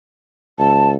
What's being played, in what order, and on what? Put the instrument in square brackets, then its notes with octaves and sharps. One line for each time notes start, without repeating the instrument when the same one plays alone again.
[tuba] C#2 [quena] A5